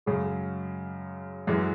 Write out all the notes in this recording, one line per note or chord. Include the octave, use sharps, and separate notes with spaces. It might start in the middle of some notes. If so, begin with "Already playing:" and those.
F#2 C#3 G#3
F#2 E3 G#3